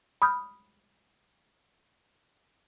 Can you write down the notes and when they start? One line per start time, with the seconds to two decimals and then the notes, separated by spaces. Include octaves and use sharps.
0.22 B5 D#6 F6 G6